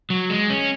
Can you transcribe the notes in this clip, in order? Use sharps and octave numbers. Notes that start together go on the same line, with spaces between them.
F#3
G#3
C#4